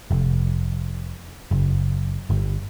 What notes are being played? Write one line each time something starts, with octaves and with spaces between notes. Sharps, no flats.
F1
F#1
G1